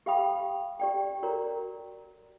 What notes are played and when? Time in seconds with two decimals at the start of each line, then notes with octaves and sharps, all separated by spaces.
0.06 G4 E5 F5 G5 B5 D#6
0.80 G4 D5 G5
1.23 F#4 A#4 C#5 D5 A#5